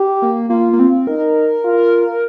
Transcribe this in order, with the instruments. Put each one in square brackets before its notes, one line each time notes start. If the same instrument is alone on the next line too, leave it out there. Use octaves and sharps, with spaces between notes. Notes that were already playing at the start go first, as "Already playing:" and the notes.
Already playing: [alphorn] G4
[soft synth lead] A#3
[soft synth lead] A#3 [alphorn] F4
[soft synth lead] A#3
C4
[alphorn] D#4 [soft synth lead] A#4
[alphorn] F4